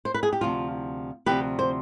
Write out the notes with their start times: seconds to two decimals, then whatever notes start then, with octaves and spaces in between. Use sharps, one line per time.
0.05 C5
0.14 B4
0.23 G#4
0.33 G4
0.41 D2 C3 F3 F4
1.26 D2 C3 F3 G4 B4
1.59 C5